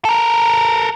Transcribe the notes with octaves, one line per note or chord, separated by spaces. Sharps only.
A4 A#4